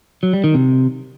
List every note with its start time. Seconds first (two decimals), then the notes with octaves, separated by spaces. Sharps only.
0.23 F#3
0.33 G3
0.44 D#3
0.54 C3